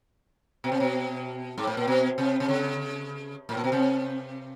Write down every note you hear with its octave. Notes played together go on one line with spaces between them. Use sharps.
B2
C3
B2
G#2
A2
A#2
B2
C3
C3
C#3
A2
A#2
B2
C3